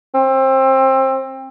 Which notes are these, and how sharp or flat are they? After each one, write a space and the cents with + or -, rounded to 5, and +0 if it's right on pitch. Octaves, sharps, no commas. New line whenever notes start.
C4 +25